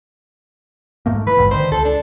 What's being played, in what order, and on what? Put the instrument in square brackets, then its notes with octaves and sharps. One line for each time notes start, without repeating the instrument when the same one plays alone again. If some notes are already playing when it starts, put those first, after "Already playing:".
[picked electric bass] G#2 A3 A#3
[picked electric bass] E3 [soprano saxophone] B4
[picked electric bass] A1 D2 G#2
[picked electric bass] D3 D#3 [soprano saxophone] C5
[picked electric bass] C#2 [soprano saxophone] A4
[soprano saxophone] D4